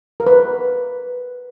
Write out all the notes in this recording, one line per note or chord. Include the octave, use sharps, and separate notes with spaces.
A#4
B4